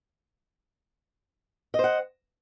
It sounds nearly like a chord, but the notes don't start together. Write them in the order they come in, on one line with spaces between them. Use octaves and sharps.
D#5 C5 F#5